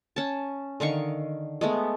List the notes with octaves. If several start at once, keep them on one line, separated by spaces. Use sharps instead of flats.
C#4 A5
D3 D#3 F5 C#6
G#3 A3 B3